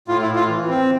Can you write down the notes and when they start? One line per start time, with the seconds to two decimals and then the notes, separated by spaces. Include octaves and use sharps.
0.08 A2 F4
0.22 E4
0.28 A2
0.35 F4
0.48 E3
0.68 C4